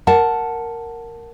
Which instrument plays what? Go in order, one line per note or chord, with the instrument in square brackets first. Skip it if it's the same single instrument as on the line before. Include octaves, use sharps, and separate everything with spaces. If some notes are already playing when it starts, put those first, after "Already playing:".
[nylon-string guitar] A#4 F#5 A5